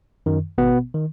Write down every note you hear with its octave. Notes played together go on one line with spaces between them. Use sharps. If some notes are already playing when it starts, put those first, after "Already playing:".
F#2 D#3
G#1 B2 B3
D#3